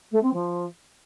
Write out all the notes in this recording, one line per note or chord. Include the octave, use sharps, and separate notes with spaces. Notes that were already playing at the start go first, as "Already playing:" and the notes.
A3
C4
F3